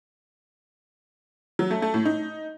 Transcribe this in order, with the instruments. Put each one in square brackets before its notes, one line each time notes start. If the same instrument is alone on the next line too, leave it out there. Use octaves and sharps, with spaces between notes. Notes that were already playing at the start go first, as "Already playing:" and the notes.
[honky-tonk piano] F#3
A3
A3
A2
D#4